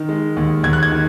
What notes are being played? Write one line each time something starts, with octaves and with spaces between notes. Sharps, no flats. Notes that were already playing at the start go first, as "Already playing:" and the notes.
Already playing: D#3
G#3
D#2
D#2 G#6
F#6
G#6
D#3